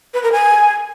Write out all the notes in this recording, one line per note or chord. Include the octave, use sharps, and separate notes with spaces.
B4
A#4
G#5